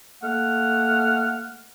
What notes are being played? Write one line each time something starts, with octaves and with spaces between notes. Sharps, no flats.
A3 A#3 F#5 F6